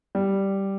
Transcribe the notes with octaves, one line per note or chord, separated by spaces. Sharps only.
G3